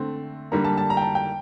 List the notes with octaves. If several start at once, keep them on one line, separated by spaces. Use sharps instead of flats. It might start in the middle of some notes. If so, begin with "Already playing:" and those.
Already playing: D3 A3 C4
D3 G3 A#3 A#5
A5
A5
A#5
G5
A5
G5